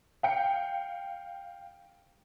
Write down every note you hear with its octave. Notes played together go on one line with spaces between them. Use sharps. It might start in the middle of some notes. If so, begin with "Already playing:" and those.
F5 G5 C#7